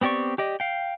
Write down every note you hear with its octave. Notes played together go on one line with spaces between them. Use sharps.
B3 C4 G4 D5 C#6
G4 D5 D#5
F5 G5